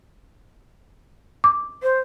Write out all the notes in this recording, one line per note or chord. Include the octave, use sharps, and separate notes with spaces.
D6
C5